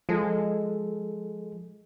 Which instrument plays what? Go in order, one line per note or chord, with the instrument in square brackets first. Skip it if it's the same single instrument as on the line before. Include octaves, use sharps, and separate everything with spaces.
[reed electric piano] F3 A4 [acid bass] G#3